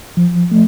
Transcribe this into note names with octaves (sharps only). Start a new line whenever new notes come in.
F3
A3